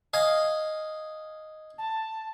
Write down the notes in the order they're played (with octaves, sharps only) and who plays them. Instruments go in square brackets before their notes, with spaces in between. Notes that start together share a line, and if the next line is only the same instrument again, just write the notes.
[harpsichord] D#5 F5 G#5
[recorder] A5